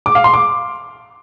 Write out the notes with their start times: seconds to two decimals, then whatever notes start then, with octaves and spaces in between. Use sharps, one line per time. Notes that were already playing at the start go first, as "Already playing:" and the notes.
0.06 D6
0.15 F5
0.24 C6
0.34 D6